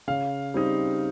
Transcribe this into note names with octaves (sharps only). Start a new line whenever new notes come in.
C#3 F5
G3 C4 D#4